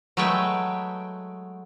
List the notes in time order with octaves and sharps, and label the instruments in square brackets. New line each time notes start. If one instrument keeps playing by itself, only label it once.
[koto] F#3 G#3 A3 B4 G5